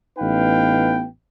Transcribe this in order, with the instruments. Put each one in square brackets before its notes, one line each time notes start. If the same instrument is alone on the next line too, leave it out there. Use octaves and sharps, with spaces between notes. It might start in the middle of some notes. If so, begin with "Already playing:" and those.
[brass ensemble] A1 B3 D#4 B4 F5 G5